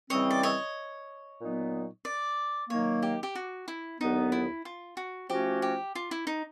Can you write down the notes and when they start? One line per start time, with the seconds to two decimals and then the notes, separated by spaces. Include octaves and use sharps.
0.10 C#3 E3 G3 C4 C#5 D#5
0.31 D5
0.43 C#5 D#5
1.40 A#2 F#3 B3 D#4
2.05 D5
2.70 D#3 F#3 A#3 C#5
3.03 G4
3.23 G4
3.35 F#4
3.68 E4
4.00 D#2 D3 F#3 B3 D#4
4.32 E4
4.65 F4
4.97 F#4
5.30 F3 A3 C#4 F#4 G4
5.62 G4
5.95 F4
6.11 E4
6.27 D#4